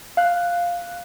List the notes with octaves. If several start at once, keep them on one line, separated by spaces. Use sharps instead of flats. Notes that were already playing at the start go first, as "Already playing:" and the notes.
F5 F#6